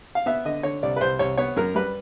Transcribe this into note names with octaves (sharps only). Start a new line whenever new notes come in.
F5
B3 E5
D3 D#5
D3 C#5
C2 D5
B4
C2 C5
C2 C#5
B3 C#5
F#2 A#4
G3 B4